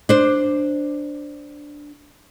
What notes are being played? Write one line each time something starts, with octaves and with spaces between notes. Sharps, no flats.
D4 C5